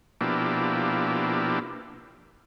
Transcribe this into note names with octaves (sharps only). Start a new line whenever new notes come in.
B2 F3 A#3 D4 E4 G4